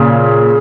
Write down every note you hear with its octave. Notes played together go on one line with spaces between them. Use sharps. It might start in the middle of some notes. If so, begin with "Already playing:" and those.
Already playing: A#2 C#3